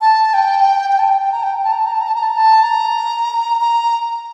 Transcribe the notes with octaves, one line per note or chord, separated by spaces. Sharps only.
A5
G5
G5
A5
G5
G5
A#5
G5
A5
A#5
A5
A#5
A5
A#5
A5
A#5
A5
A#5
A5
A#5
A#5